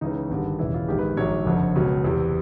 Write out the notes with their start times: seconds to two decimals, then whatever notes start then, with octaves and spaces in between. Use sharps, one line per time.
0.01 C#2 C#3 E3 D#4
0.30 G#1 G2 D3
0.59 E1 D#2 C#3 E3 E4
0.74 F4
0.88 A#1 G#2 D#3 G4
0.98 B4
1.17 A#1 G#2 D#3 F#3 C#5
1.46 F#1 F2 D3 F3
1.76 C#2 B2 F#3
2.04 E2 C3 E3